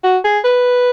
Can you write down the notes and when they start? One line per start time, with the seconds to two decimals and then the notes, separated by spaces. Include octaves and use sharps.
0.04 F#4
0.24 G#4
0.44 B4